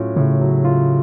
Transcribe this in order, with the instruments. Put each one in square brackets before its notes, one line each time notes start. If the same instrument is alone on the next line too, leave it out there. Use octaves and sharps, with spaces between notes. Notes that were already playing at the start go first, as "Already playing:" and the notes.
Already playing: [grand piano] A2 F#3 C#4 F4
[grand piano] A2 [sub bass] C#3
[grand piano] F#3
F4